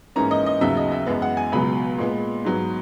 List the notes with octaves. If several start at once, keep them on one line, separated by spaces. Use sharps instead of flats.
G#2 E3 A#3 C#4 A#5
D#5
D#5
D#2 C#3 F#3 B3 E5
D#5
E5
F#2 E3 G#3 B3
F#5
G#5
C#2 B2 F#3 B3 B5
A#2 G#3 B3
G#2 F#3 B3